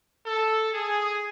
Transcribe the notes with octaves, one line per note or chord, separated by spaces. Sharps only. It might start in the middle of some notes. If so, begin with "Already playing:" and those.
A4
G#4